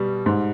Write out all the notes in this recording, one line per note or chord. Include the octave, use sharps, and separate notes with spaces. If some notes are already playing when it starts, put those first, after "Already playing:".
Already playing: B2 G3
G#2